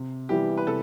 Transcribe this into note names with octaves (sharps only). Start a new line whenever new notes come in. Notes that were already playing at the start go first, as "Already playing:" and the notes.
Already playing: C3
E3 G3 B3 E4 G4
B4
C3 A4